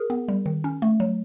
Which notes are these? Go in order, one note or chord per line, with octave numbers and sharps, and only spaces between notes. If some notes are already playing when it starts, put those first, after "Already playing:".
Already playing: G#4 A#4
B3
G3
D#3
C#4
A3
F#3